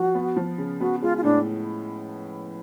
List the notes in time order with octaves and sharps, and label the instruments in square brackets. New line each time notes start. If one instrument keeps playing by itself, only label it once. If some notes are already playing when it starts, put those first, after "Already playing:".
Already playing: [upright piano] F3 [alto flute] F#4
[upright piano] B3
F3
C#3
[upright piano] B3 [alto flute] F#4
[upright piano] G#3 [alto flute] F4
[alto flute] F4
[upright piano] A2 [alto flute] D4